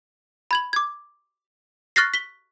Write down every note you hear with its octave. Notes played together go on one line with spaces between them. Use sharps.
B5 G#6 F#7
D6 G#6
C#6 F6 F#6 A6 A#6 C7
B6 G7